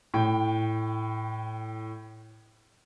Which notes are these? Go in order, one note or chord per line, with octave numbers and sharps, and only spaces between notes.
A2 G5